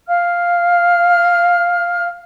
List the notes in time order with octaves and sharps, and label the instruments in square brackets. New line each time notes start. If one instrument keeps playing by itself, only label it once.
[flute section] F5 F6